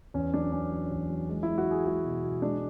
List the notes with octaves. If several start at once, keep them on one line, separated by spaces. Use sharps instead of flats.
E2 C#4
F#3 D4
F#3 C#4
F#3
E2
F#3
G#3
G#3 E4
F#4
G#3 G#4
G#3 F#4
B2
B2
G#3 D4